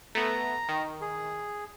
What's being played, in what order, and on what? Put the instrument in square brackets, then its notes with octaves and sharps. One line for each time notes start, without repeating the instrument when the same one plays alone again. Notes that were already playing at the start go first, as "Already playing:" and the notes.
[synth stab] A3 B3 [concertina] A#5
[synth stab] D#3
[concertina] G#4